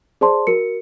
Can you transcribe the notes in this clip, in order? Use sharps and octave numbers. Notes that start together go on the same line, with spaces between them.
G#4 C5 D5 A5 C6
F#4 A#4 C#7